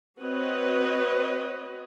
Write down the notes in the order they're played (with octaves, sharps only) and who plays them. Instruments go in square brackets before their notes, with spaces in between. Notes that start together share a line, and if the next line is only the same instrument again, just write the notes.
[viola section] C4 F#4 B4 C#5 D#5